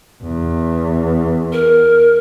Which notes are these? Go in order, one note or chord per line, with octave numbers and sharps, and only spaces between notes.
E2
A#4